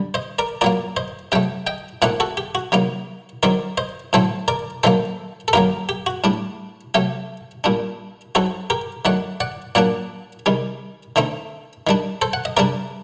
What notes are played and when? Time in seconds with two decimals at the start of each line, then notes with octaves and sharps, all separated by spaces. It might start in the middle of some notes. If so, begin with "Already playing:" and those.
Already playing: D3 G3
0.14 C5 D#5
0.39 A#4 D5
0.61 A#2 F#3 A#3 A#4 D5
0.97 C5 D#5
1.32 C3 F#3 A3 D#5 G5
1.67 D#5 G5
2.02 A#2 A3 C4 D#4 D5 F#5
2.20 F#4 A4
2.37 G4
2.55 F#4
2.72 C3 F#3 A#3 D#4
3.43 D#3 F#3 C4 A#4 D5
3.77 C5 D#5
4.13 A2 F#3 A3 C4 A4 C5
4.48 A#4 D5
4.83 D#3 F#3 A#3 A4 C5
5.48 A4
5.53 F#3 A#3 D#4 G4 A#4
5.89 G4
6.06 F#4
6.24 A2 G3 D4
6.94 C3 F#3 A3 G4
7.64 A#2 G3 D4
8.35 F#3 C4 D#4 F#4 A4
8.70 G4 A#4
9.05 D#3 F#3 A3 D5 F#5
9.40 D5 F#5
9.75 A#2 F#3 A#3 D4 D5 F#5
10.46 C3 D#3 G3
11.16 D3 A3 C4 D#4
11.87 D#3 G3 D4
12.22 A4 C5
12.33 F#5
12.45 D#5
12.57 C3 G3 D4 A#4 D5